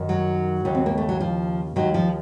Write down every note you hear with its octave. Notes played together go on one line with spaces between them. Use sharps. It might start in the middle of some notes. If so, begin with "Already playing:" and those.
Already playing: F#2 D#3
F#3
D#2 C#3
C4
A#3
A3
F#3
F3
D#2 D#3 F#3
F3